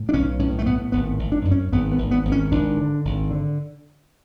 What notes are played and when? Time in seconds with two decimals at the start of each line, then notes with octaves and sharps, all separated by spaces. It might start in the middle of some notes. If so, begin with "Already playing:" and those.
Already playing: A2
0.09 D4
0.13 B1 C#4
0.39 A2 C#4
0.59 A3
0.66 A2 B3
0.92 G#1 B3
1.19 G#1
1.32 D4
1.45 F#2
1.51 C#4
1.72 G#1 B3
1.92 B3
1.98 G#1
2.11 B3
2.25 G#1
2.32 C#4
2.51 G#1 D4
2.77 D3
3.05 G#1
3.31 D3